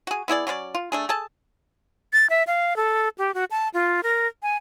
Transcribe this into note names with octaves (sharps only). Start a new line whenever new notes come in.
F#4 G#4
B3 E4 G#4 D5
F#3 C#4 B4 D5
F4
A3 D4 G#4
G#4 A4 A5
A6
E5
F5
A4
G4
F#4
A5
F4
A#4
G#5